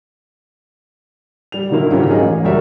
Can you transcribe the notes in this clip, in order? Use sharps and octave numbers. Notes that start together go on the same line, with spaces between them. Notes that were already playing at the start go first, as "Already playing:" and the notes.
G3 F7
A#2 D3 D#3 F#3 A#3 E4
G#2 C#3 F#3 C#4 F4 G4
D#4 F4 G#4 A#4
A1
F#1 G3 F#4 A#4 E5